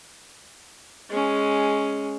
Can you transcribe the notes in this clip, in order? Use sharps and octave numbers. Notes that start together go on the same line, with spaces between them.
G#3 C#4